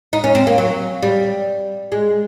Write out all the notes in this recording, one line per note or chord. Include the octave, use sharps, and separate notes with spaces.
D#4
C#4
C4
A#3
F#3
G3
G#3